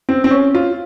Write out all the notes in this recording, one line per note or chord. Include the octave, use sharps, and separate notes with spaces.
C4
C4
C#4
F4